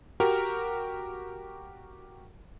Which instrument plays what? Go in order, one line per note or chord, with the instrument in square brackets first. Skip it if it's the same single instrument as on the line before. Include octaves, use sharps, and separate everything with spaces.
[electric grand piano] F#4 G4 A#4